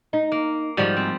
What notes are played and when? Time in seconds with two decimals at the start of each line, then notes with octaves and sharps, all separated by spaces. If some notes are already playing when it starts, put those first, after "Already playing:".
0.13 D#4
0.32 A#3
0.77 G#2 F3 G3 F#4
0.97 C4